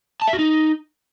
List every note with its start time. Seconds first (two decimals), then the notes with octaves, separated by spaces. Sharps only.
0.22 A5
0.27 E5
0.33 F#4
0.39 D#4